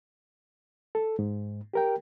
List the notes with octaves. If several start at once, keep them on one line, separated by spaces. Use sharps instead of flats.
A4
G#2
G4 A#4 G5